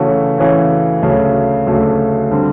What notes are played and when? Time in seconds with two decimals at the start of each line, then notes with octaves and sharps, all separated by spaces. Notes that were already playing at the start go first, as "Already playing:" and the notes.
Already playing: C#3 E3 A3 C#4 F#4
0.38 C#3 E3 A3 C#4 F#4
1.02 D2 C#3 F#3 A3
1.67 D2 C#3 F#3 A3
2.31 D3 G3 C4